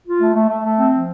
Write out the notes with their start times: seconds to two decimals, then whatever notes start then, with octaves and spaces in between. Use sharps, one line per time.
0.05 F4
0.19 A3
0.35 A3
0.48 A3
0.63 A3
0.78 C4
0.93 F3